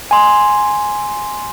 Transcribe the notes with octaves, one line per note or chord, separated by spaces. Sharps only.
G#5 C6